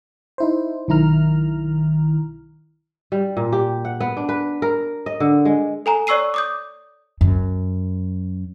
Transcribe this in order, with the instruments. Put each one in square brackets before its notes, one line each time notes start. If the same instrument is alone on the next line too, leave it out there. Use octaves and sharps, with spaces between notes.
[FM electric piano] D#4 E4 C5
B1 D#3 E4 A#5 F6
[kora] G3
A#2
G4
F#5
B3
D4
B4
A#4
D#5
D3
G#3
[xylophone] A4 G#5 A#5
C#5 D5 C#6 E6 C7 D#7
D6 D#6 G6
[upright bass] F#2